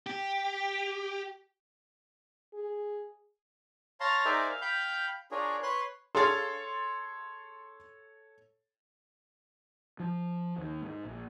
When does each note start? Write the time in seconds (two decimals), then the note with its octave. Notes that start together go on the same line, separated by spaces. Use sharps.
0.07 G4
2.54 G#4
4.00 C#5 F5 A5 A#5 C6
4.25 D#4 G#4 A#4 C5 D5 E5
4.48 F5
4.61 F5 G5 B5 G6
5.31 D4 F4 G#4 A#4 C#5
5.63 B4 C#5 C6 F#6
6.15 D4 G#4 A4 C#5 F5 C6 A6
10.00 F3
10.58 D#2
10.82 G#2
11.05 A#1